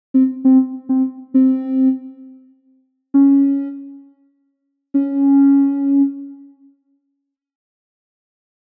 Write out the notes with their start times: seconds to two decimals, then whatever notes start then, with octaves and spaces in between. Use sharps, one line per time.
0.14 C4
0.45 C4
0.89 C4
1.34 C4
3.14 C#4
4.94 C#4